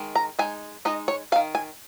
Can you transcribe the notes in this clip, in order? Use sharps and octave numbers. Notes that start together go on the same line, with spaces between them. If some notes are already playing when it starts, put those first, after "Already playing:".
Already playing: D#3 G#3
A#5
G#3 D#4 G#5
G#3 D#4 D#5
C#5
C#4 F5
D#3
G#5